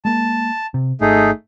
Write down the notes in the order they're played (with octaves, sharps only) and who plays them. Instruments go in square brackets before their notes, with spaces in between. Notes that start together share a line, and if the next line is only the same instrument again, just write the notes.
[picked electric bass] G#3 A#3 [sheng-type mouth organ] A5
[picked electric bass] C3
[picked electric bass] G#1 [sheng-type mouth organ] A3 D#4 G#4